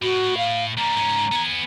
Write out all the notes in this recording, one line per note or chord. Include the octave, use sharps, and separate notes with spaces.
A2 F#4
F5
G3 A#3 A#5
G#2 C#4
B3 G#5